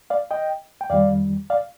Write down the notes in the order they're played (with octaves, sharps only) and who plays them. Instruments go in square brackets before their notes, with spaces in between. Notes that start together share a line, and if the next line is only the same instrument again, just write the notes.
[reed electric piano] D5 F5
D#5 G5
G5
F2 D#3 G3 D5 F5
D5 F5